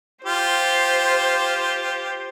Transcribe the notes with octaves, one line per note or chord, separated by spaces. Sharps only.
F4 G4 C5